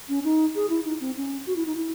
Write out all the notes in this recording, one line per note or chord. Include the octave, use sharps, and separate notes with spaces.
C#4
D#4
G#4
E4
D#4
C4
C#4
F#4
E4
D#4
E4